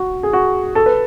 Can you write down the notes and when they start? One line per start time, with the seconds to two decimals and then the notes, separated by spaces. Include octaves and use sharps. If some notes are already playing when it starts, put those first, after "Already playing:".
Already playing: F#4
0.23 G#4
0.33 F#4
0.75 A4
0.86 B4